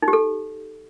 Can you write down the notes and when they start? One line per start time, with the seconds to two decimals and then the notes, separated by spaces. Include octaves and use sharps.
0.02 D#4
0.08 G4
0.13 A4